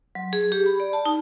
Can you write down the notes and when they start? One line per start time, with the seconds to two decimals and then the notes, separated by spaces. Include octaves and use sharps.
0.15 F#3
0.33 G#4
0.52 G4
0.66 B5
0.80 D5
0.93 A5
1.06 D#4